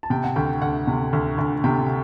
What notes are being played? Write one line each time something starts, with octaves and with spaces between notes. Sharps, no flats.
A5
C3 G5
F#5
D2 G5
D2 F#5
C3
D2
D2
C3 G5